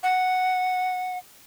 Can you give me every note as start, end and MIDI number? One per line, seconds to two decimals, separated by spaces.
0.03 1.18 78